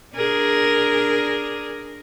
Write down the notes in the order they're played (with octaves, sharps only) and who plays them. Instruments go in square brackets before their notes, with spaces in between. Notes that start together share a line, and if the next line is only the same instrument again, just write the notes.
[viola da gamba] D4 G#4 A#4